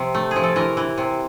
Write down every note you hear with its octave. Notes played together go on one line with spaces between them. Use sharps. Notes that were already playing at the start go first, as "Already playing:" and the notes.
Already playing: C3 F3
A3
F3 G#4
A4
E3 A#4
E3
C3